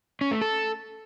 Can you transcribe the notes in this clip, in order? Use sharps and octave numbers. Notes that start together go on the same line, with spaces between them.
C#4
A3
A4